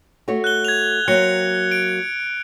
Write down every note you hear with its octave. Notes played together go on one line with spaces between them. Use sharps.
A3 F#4 C#5
F#6 G7
G#6 F7
F#3 A#3 C4 F#6 C#7 G7
D7